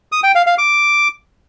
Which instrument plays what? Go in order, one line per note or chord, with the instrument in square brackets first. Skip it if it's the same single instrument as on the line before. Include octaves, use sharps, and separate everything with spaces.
[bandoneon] D#6
G5
F5
F5
D6